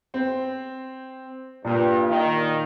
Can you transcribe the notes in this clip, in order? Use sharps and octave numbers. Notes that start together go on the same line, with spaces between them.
C4 C5
G2 A#2
D#3